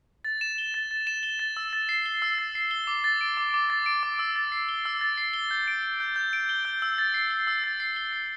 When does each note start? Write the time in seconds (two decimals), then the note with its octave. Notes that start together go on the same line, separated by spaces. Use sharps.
0.25 A6
0.41 E7
0.58 G7
0.74 A6
0.91 A6
1.07 E7
1.23 G7
1.39 A6
1.57 E6
1.73 A6
1.89 C7
2.06 G7
2.22 E6
2.38 A6
2.55 C7
2.71 G7
2.87 D6
3.04 A6
3.21 D7
3.37 D6
3.54 D6
3.70 A6
3.86 D7
4.03 D6
4.19 E6
4.36 A6
4.52 C7
4.69 G7
4.85 E6
5.01 A6
5.18 C7
5.33 G7
5.51 G6
5.68 D7
5.83 G7
6.00 G6
6.16 G6
6.33 D7
6.49 G7
6.65 G6
6.82 E6
6.98 A6
7.14 C7
7.31 G7
7.47 E6
7.64 A6
7.80 C7
7.96 G7
8.13 A6